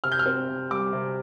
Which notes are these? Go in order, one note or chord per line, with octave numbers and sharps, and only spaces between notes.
C3 F6
G6
F6
C4
C3
G3 D6
C3